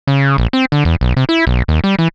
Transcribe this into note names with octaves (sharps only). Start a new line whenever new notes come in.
C#3
A#1
C4
D3
E2
B1
C3
E4
B1
D#2
G3
E3